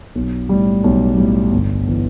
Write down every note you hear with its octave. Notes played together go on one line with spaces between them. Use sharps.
B1
A2 G3
B1
A2 G3
G1
E3 B3